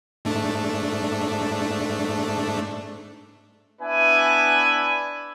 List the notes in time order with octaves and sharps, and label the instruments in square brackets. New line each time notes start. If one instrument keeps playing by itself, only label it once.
[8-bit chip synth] G#2 A3 D4
[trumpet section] B3 D4 E4 B4 E5 G#5